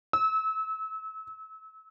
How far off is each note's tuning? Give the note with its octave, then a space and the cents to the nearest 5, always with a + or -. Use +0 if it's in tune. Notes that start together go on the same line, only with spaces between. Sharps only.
E6 -30